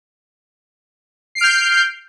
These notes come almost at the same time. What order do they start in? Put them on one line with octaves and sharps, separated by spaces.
C7 D7 F6 G6